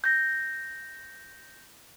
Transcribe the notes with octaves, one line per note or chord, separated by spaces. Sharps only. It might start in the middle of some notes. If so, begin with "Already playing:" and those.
G6 A#6